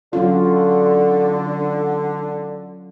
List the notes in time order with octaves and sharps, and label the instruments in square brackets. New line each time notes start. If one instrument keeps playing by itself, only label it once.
[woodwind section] D3 [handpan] F#3 C#4 F4